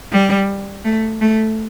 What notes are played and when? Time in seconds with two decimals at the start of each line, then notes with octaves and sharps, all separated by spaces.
0.11 G3
0.84 A3
1.21 A3